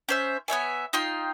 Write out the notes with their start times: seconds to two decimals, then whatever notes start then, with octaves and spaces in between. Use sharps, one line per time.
0.09 C#4 C5 E5
0.48 B3 C#5 E5 G#5
0.93 D#4 F4 G5 C6